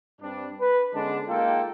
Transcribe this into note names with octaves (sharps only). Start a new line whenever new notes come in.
G2 G3 C4 D4
B4
D3 G#3 B3 C#4 D4
G#3 A#3 D#4 F4 A4 G5